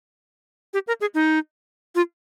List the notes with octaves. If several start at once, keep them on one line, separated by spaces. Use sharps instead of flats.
G4
A#4
G#4
D#4
F4